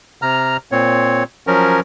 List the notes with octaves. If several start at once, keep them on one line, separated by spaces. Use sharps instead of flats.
C3 A#5 F6
A#2 C4 C#5
F3 F#3 C#4 A#4